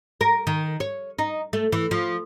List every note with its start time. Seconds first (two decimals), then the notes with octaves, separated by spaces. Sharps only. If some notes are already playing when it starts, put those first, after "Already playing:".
0.21 A#4
0.47 D#3
0.80 C#5
1.19 D#4
1.53 A3
1.73 E3
1.91 F3